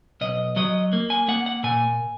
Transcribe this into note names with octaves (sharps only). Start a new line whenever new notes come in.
B1 D#5
F#3 D#5
A#3
G#5
A#3 F#5
F#5
A#2 G#5